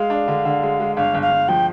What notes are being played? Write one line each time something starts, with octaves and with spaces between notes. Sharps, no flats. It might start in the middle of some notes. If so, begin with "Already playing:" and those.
Already playing: G#3 F5
D4
D3
D3
G#3
G#3
G1 F5
G1
F5
G1
F3 G5